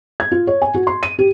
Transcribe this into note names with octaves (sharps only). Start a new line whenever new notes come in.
G#6
F4
C#5
G#5
F#4
C6
D#7
G4